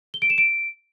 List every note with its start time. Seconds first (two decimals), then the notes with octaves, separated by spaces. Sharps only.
0.14 G7
0.22 D7
0.30 E7
0.38 D7